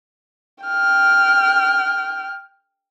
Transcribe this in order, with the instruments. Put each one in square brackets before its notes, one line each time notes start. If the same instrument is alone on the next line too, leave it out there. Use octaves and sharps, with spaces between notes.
[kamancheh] G5 F6